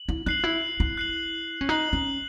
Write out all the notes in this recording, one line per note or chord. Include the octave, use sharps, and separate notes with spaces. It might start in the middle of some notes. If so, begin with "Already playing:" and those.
Already playing: F#7
E4
D#4 F#6 C7 F#7
E4
E4
F#6 C7 F#7
C#4
D#4 F#6 C7 F#7
C#4